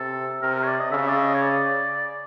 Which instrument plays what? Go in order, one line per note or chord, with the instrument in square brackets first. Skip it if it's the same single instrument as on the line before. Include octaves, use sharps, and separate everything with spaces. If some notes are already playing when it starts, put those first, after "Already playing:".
Already playing: [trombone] C3 [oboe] A4
[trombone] C3 [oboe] A#4
[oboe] A#4
C#5
D5
D#5
[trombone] C#3 [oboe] E5
[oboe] D5
D#5
C#5
D5